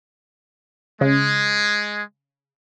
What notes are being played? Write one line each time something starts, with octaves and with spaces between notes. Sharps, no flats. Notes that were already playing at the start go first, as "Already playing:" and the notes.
C#3 G#3